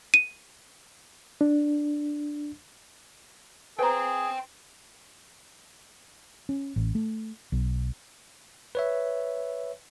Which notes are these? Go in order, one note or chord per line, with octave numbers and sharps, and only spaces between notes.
D#7
D4
G#4 B4 C5 G5 A#5 C6
C#4
A1
A3
B1
B4 C#5 E5